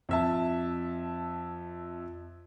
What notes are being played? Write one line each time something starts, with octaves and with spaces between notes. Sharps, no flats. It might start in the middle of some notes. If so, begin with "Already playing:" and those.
F2 E5 A5